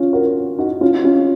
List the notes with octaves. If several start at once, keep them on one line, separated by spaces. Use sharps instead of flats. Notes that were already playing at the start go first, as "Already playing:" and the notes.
Already playing: C#4 F4
F#4 A#4
D#4 F#4
C#4 F4
F#4
C#4 F4